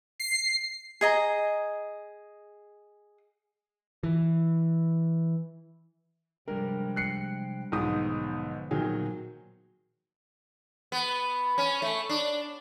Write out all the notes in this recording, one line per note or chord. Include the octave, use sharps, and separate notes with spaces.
C7
G#4 D#5 A#5
E3
C3 F3 G3 G#3 D4 A#4 G5
F#6 C7 C#7
B1 G#2 D3 F3 B3 D#6
A#2 D#3 F#3 G#4 G5
B3
C#4
A3
D4